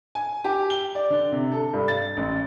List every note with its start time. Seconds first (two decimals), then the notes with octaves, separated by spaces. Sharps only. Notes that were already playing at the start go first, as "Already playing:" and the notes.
0.15 G#5
0.44 G4
0.70 G7
0.95 D5
1.10 D3
1.32 C3
1.52 A4
1.73 G2
1.88 A6
2.17 A1